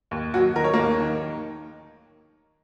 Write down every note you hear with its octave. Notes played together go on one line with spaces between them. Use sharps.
D#2
D#2 F#3 F#4
D#3 A#4
C#5
D#2 A#3 A#4
D#3